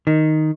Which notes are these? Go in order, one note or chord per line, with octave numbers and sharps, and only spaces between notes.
D#3